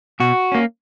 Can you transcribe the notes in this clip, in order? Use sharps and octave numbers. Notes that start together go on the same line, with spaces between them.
B2 F#4
A#3 C#4